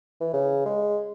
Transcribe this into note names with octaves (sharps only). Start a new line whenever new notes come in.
E3
C#3
G#3